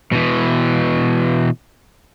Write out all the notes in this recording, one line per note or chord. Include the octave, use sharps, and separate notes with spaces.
B2 E3